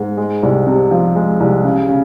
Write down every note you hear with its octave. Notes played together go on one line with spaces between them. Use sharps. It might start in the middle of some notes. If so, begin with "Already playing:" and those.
Already playing: G#2
G#3
C2
C3
F3
G#3
C2
C#3
C#3